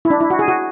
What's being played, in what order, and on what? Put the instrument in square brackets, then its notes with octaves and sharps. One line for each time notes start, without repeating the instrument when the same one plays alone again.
[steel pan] E4
D4
E4
F#4
G#4
F#4